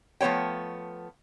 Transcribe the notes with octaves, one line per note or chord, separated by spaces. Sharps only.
F3 A3 B3 C#5 G5